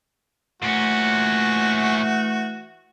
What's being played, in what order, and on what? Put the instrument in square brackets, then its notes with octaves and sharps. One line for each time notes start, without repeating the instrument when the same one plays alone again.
[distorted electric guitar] A#2 C#4 [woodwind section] E3 A3 [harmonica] F#4